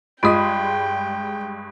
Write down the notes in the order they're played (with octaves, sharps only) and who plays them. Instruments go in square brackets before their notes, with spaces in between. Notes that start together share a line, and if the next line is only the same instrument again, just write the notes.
[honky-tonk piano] G2 G#3 [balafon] F4 D#5 [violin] G5 [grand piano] B5 D#6